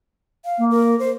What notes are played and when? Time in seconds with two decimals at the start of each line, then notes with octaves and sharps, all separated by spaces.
0.45 F5
0.58 A#3
0.71 A#4
1.00 C5